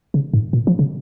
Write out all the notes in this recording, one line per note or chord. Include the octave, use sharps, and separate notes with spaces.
C#3
G#2
A#2
F3
C#3